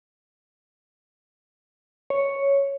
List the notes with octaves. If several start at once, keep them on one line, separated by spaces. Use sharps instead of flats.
C#5